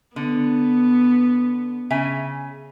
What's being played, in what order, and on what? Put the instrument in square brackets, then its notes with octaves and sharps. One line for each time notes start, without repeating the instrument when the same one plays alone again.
[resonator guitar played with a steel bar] D3 [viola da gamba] B3
[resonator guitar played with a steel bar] C#3 E5 G#5